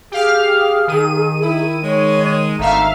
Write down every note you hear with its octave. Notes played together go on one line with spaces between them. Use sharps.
G4 G#4 F5 F6
D#3 D#7
E4
G#3 C#5
G#1 D3 A3 D#4 E5 F5 A#5